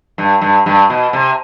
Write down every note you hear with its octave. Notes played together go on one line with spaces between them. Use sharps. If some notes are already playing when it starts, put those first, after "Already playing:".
G2
G2
G2
B2
C3